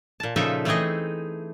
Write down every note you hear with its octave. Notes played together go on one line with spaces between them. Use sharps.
A#2 A5
A#2 C#3 F3 D#4 A4 E5
E3 A3 C4 D#4 G#4 D#5